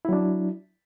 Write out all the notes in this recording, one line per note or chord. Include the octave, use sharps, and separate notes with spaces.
F#3 D4 E4